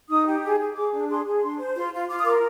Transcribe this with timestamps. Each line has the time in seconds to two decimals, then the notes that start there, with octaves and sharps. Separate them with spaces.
0.09 D#4 D#6
0.26 G4
0.43 G#4
0.59 G#4
0.75 G#4 D6
0.93 D4
1.10 G#4 C6
1.25 G#4
1.42 D4 C6
1.59 C5
1.76 F4 C6
1.93 F4
2.09 F4 D6
2.18 D#6
2.26 A#4 D6